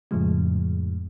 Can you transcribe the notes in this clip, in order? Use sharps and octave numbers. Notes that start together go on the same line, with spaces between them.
F2 A2 C#3 F3 G#3